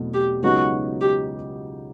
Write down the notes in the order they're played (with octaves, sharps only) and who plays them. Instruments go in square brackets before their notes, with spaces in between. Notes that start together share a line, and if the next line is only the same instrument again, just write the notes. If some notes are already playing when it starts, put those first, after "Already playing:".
Already playing: [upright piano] E2 B2 F#3 A3 C4
[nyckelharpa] G4
[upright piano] C#2 C#3 F#3 B3 D#4 [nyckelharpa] F#4
[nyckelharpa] G4